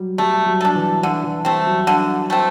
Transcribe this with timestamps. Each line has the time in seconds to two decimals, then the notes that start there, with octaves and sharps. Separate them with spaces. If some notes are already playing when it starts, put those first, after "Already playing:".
Already playing: F#3 G3
0.18 G3 A3
0.46 F#3
0.61 D4 A4
0.75 E3
1.03 D3 E3
1.24 E3
1.45 G3 A3 C4
1.66 F#3
1.87 D3
2.30 A3 C4